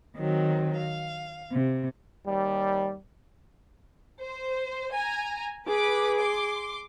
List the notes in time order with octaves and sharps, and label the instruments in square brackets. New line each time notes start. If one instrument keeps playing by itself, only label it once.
[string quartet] D#3 F#3 C4
F5
C3
[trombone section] D#2 G3
[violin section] C5
G#5 A#5
[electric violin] G#4 [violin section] B4 D6
[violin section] C6 D6